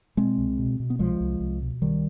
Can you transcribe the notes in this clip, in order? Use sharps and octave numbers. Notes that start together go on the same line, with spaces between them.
B2 G#3 C4
C2
B2
B2
B3
C2 F3 G#3
C2
C2
B2
C2 D#3 G3